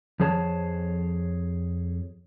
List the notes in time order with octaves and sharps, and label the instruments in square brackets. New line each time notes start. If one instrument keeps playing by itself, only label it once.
[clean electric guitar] F2 F3 G#4 C#5 A5